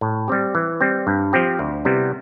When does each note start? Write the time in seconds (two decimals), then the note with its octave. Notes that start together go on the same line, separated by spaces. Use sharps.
0.01 A2
0.28 G3 C4 G4
0.55 E3
0.81 G3 C4
1.07 G2
1.33 F3 C4 G4
1.59 D2
1.85 C3 G3 B3 E4